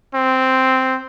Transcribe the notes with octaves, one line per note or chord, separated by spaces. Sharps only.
C4